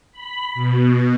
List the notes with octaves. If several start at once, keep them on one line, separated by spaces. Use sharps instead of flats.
B5
B2